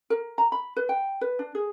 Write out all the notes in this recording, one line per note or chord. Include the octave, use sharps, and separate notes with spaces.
A#4
A#5
B5
B4
G5
B4
D4
G#4